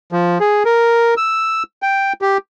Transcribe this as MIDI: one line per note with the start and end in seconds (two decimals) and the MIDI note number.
0.12 0.38 53
0.41 0.63 68
0.65 1.14 70
1.17 1.63 88
1.82 2.13 79
2.22 2.38 67